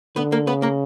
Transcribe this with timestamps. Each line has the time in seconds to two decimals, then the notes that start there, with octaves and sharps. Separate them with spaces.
0.16 D3 B3 B4
0.32 A#3 A#4
0.47 C#3 B3 B4
0.62 A#3 A#4